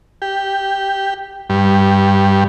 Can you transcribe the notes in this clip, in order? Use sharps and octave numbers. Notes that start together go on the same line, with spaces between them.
G4
G2